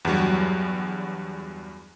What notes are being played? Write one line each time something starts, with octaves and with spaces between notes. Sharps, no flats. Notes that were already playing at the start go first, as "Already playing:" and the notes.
E2 G2 F#3 G3